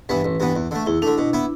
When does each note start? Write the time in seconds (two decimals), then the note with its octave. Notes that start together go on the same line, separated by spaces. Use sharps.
0.09 G2 E3 B3 B4
0.24 A1
0.40 G2 E3 B3
0.56 E2
0.71 D3 A3
0.86 E2 E4
1.02 D3 A3 D4
1.18 B2
1.33 B3 E4